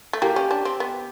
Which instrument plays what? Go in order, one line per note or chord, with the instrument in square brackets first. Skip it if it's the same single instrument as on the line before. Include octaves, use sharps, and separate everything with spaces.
[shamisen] A3
[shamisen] A#3 [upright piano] G4
[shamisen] C#4
D4
C4
B3